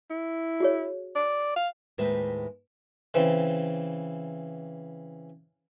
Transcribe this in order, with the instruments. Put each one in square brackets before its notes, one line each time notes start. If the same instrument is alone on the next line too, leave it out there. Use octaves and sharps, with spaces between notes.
[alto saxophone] E4
[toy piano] F#4 G#4 C#5
[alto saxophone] D5
F5
[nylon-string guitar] D#2 A2 G#3 B4 C5 E5
[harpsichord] C#3 E3 C4